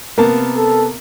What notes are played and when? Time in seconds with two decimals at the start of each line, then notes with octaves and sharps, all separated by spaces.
0.18 C3 A#3 B3 A5
0.57 A4